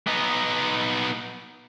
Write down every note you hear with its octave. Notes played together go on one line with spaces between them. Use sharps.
B3 D#4